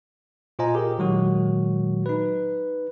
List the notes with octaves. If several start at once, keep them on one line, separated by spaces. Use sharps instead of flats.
A#2 F4 C5 D#5 G#5 A#5
G4 G#4 A#4
A#2 D#3 F#3 G#3 F#4
D#4 B4